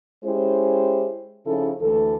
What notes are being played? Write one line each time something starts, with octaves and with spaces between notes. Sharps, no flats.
G#3 C#4 E4 G4 C5
C#3 F3 C#4 D#4 E4 A4
D2 E3 A3 A4